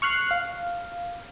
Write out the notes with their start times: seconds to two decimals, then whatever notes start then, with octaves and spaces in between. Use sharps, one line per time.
0.02 C#6 F6 F#6 C7
0.31 F5